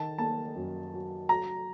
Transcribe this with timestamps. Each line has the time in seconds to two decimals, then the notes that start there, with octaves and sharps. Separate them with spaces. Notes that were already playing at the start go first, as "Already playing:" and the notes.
Already playing: D#3 A5
0.18 A#3 A5
0.56 F#2
0.93 F#3
1.29 F#3 A#5